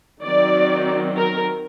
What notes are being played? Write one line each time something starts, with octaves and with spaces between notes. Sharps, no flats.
D#3 F#3 C4 D5
A#4